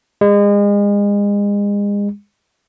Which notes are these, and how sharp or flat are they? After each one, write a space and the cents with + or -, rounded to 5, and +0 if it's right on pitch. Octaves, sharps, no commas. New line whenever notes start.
G#3 -35